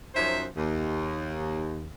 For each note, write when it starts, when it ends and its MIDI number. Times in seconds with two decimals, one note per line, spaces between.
0.14 0.45 42
0.14 0.45 53
0.14 0.45 61
0.14 0.45 63
0.14 0.45 72
0.14 0.45 76
0.56 1.91 39